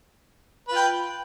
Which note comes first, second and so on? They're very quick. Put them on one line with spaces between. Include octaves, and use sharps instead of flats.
B4 F4 G5